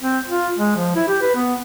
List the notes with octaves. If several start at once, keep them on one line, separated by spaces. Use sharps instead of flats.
C4
F4
G#3
F3
E4
G4
B4
B3